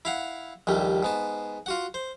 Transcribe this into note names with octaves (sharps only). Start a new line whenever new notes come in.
E4 F5 F#5
A#1 D#2 G3 A3
G#2 B3 A5
F4 F#4 F#5
C5